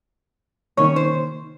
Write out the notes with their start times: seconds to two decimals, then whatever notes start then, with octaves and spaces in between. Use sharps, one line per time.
0.77 C3 D#3 A#3 C#4 D#4 C#5
0.96 C5